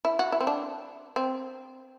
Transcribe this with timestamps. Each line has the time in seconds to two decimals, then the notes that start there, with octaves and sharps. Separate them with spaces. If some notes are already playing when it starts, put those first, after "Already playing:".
0.05 E4
0.19 F#4
0.32 E4
0.41 C4
0.47 D4
1.16 C4